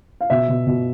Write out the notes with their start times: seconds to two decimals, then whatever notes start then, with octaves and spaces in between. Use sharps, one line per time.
0.21 F5
0.30 B2 E5
0.48 B2
0.67 B2